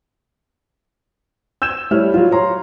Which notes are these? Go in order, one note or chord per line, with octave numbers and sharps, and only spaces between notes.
E6 G6 G#6 E7
G3 A3 E4 C#5 F6
F#3 F4
C#5 A#5 C6